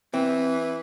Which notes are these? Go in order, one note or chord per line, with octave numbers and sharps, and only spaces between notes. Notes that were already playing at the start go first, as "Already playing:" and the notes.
E3 C4